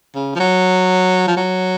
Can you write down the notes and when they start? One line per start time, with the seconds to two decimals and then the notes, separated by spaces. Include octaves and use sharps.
0.15 C#3
0.35 F3
0.40 F#3
1.28 F3
1.37 F#3